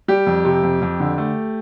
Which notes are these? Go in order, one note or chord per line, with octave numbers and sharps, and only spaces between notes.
G3 G4
F2
C3
F2
F2
D3
A3